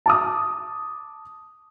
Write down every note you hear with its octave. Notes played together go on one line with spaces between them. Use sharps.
A5 D6 D#6